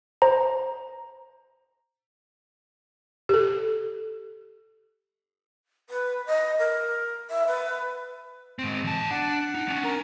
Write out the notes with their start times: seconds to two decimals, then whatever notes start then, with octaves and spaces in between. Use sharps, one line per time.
0.22 C5 A#5
3.29 G4 A4
5.90 B4
6.27 D#5
6.59 A#4
7.30 E5
7.47 B4
8.59 G#2 C4
8.84 E2 A5
9.11 D4 F#5
9.55 D#4
9.68 C#4 D4
9.84 A#4